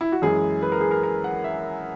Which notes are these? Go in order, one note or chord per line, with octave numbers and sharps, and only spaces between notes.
E4
F#4
F#2 E3 G#3 G#4
B4
A#4
G#4
A#4
A#4
F#5
E5